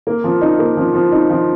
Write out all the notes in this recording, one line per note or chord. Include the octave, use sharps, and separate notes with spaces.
A#3
F3
D#4
A#3
F3
F3
D#4
F3